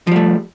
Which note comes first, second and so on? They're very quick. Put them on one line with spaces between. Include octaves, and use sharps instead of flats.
F3 G3 A3